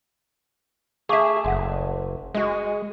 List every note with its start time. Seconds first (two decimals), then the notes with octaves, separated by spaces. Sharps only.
1.09 A3 G#4 E5 F5 C#6 D6
1.44 F#1 F#5 C6
2.34 G#3 F#4 D#5